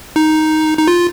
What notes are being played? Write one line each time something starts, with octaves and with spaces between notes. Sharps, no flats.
D#4
D#4
F4